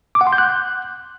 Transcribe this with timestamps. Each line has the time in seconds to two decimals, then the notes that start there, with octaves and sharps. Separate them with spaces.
0.15 D6
0.21 F#5
0.27 C6
0.33 G6
0.38 F#6